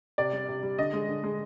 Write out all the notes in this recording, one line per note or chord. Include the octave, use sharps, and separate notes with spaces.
C3 D5
G3
C3
G3
D3 D#5
G#3
D3
G#3